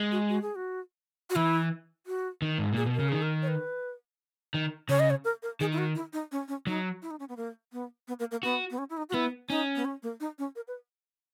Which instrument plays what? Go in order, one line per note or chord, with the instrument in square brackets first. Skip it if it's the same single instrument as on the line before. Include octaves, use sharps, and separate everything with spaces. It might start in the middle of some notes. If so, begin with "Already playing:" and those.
Already playing: [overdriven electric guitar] G#3
[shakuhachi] F#4
F#4
G#4
F#4
F#4
[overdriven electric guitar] E3 [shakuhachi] E4
[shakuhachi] F#4
[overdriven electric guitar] D#3
G#2
[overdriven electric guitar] A#2 [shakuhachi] G#4
[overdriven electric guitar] B2
[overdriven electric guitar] C#3 [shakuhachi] A#4
[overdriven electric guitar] D#3 [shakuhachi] G#4
[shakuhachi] A#4
C#5
B4
[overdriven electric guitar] D#3
[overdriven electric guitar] C#3 [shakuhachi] C#5
[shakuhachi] D#5
C#5
A#4
A#4
[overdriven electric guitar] D#3 [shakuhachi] G#4
[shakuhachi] E4
F#4
E4
D#4
C#4
C#4
[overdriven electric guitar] F#3 [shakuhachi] D#4
[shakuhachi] E4
D#4
C#4
B3
A#3
B3
B3
A#3
A#3
[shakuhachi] B3 [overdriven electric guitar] F#4
[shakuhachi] B3
C#4
E4
D#4
F#4
[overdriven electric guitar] B3 [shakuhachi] E4
[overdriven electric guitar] C#4 [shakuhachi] D#4
[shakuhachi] B3
C#4
A#3
D#4
C#4
A#4
B4